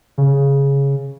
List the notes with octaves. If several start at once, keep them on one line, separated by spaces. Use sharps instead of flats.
C#3